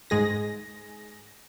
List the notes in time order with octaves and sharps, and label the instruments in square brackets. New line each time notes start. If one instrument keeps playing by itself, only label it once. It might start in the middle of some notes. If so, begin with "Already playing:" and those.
[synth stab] G#2 G#3 G#4 A#6